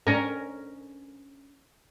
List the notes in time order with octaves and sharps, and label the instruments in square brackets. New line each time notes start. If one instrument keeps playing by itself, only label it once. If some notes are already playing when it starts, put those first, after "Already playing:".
[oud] C#4 A#4